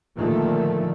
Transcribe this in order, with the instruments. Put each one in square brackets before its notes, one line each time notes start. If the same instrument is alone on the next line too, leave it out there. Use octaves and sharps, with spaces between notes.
[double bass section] A#2 D3 D#3 F3 A3